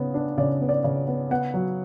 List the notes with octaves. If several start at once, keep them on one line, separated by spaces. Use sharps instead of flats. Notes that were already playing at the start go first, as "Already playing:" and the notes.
Already playing: C#3 B3
D4
C#3 D5
B3
D5
C#3
B3
B3 F#5
F#3